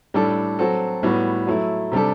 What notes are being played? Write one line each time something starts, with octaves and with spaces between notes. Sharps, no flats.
A2 G3 D4 A4
F#3 C4 F#4 A4
A2 G3 B3 F#4
F#3 A3 E4
C3 G3 D4 A4